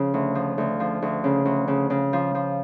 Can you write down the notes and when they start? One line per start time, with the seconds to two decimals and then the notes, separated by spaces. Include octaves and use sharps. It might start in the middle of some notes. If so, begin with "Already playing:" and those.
Already playing: C#3 F3
0.14 D2
0.35 F3
0.58 D2
0.80 F3
1.02 D2
1.24 C#3
1.45 D2
1.68 C#3
1.90 C#3
2.13 F3
2.35 F3